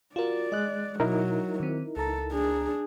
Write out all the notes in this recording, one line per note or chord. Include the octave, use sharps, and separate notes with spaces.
F4 F#4 A#4 D5
G#3 D#5 F#6
B2 F#3 D#4 E4 A#4
D#3 C4
C#2 A4 A#5
D4 G#4